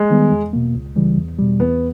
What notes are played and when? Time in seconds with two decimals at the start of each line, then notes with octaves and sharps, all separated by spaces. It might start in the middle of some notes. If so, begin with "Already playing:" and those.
Already playing: G#3
0.10 D#3 G3 B3
0.31 E2
0.53 B2 A#3
0.74 C#2
0.96 C#3 E3 G3
1.17 E2
1.39 B2 G3
1.60 E2 B3